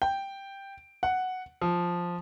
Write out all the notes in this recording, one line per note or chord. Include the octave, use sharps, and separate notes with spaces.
G5
F#5
F3